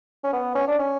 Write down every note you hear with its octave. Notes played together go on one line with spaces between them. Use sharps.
C#4
B3
C#4
D4
C#4